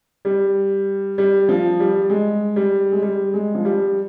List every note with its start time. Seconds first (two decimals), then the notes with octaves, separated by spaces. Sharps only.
0.25 G3
1.18 G3
1.49 F3
1.80 G3
2.10 G#3
2.56 G3
2.92 G#3
3.02 G3
3.34 G#3
3.55 F3
3.65 G3